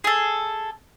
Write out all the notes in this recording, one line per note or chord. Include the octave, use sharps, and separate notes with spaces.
G#4 A4